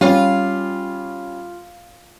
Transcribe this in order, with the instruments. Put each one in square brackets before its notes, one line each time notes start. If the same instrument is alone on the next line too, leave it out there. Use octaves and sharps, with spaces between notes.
[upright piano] G3 C#4 [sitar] F4